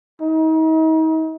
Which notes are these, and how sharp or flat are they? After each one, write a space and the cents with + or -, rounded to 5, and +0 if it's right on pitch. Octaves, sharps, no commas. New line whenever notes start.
D#4 +40